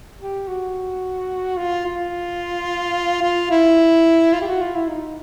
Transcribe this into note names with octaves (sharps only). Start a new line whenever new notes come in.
G4
F#4
F4
F4
F4
E4
F4
G4
F#4
F4
E4
D#4